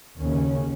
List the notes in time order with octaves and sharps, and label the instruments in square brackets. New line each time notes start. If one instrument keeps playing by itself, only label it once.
[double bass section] D#2 C#3 C#4